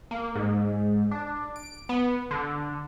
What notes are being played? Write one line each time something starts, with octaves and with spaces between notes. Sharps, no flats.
A#3
G#2
D4
D7
B3
D3